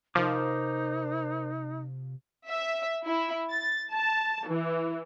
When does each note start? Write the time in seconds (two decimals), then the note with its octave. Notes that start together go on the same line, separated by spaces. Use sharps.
0.15 C3 F3 D#4 A#4 C5 D6
2.47 E5
3.06 E4
3.51 A6
3.92 A5
4.48 E3